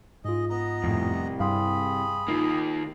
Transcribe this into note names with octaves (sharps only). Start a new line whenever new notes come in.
G#2 F4 G#4 D#5
B3 D#5 A#5
C2 F2 A2
G2 G#4 F5 G5 B5 C6
D#3 A#3 D#4 F4